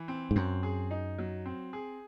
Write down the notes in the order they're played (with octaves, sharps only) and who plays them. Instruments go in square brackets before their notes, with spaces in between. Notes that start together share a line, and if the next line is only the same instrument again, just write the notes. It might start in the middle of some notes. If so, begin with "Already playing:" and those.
Already playing: [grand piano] E3
C4
[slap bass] G#2
[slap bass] F#2 [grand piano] C4
[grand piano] G#4
D#4
F#3
C4
G#4